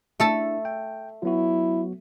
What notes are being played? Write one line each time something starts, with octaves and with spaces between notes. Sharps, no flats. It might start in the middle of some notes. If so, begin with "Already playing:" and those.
A3 D4 E4 A4 A5
G5
F#3 B3 E4 F#4